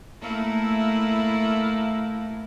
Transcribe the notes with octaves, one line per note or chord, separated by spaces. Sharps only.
A3 A#3 E4